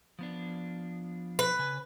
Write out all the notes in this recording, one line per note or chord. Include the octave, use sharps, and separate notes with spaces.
F3 B3 D4
B4
C#3 G#5